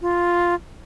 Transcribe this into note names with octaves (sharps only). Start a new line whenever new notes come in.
F4